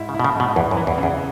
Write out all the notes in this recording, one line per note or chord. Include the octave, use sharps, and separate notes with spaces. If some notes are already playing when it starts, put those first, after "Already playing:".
Already playing: G#2 E4
C#3
E4
B2
C#3
G#2 B2
E2 E3
F#2
E3
E2
C#3
E2